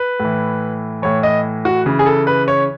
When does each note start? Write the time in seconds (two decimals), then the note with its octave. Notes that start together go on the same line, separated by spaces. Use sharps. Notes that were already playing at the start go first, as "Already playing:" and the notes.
Already playing: B4
0.20 A2 E3
1.02 A2 E3 C#5
1.23 D#5
1.65 F#4
1.86 C#3 E3
1.99 G#4
2.06 A4
2.27 B4
2.48 C#5